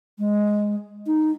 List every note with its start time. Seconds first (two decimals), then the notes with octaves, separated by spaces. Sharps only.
0.19 G#3
1.07 D#4